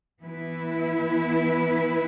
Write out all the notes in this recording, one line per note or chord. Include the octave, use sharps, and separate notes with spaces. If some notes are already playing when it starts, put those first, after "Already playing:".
E3 B3 E4 B4